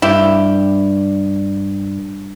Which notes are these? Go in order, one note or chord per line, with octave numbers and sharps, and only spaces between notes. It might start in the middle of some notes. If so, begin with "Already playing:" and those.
G2 E4 G4